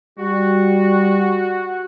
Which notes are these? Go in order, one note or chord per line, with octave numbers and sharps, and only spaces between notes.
G3 F#4